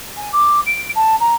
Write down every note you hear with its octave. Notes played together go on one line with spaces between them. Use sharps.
G#5
D6
D7
A5
A#5